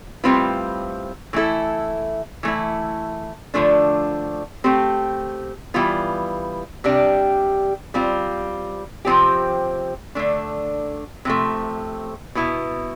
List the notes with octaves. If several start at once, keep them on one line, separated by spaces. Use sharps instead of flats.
A2 G3 C4 F4 B4
E3 A3 E4 A4
E3 A3 E4
D3 F3 A3 D4
A3 C4 G4
E3 G3 B3 F4
C3 G3 D4 G4
G3 C4 F4
C3 F3 C4 G4
D3 A3 D4
C3 F3 A3
B2 B3 E4